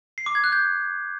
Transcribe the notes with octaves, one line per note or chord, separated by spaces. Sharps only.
C7
D6
G#6
F#6
G6